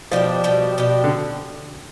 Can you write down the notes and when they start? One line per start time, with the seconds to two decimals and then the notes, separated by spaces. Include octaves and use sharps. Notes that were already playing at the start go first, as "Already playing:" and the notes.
0.11 B2 F3 G3 D4 G4
0.44 B2 G3 D4 G4
0.78 B2 G3 D4 G4
1.04 D3